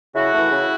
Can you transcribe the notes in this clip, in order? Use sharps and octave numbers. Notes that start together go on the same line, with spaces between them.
C#3 E4 F#4
E3 A3
C#3